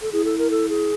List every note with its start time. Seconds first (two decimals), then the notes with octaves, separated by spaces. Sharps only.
0.02 A4
0.12 E4 G#4
0.25 A4
0.38 A#4
0.51 A4
0.69 G#4